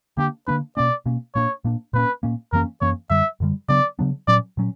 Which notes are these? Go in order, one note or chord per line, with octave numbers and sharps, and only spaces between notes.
D3 A#3 D4 G4
D3 A#3 D4 B4
B2 A#3 C#4 D5
B2 A#3 C#4
A#2 A#3 D4 C#5
A#2 A#3 D4
A#2 A#3 C#4 B4
A#2 A#3 C#4
F#2 E3 A#3 C#4 A#4
F#2 E3 A#3 C#4 C#5
F#2 D3 G3 E5
F#2 D3 G3
C#3 F#3 B3 D4 D5
C#3 F#3 B3 D4
A#2 F#3 C#4 D5
A#2 F#3 C#4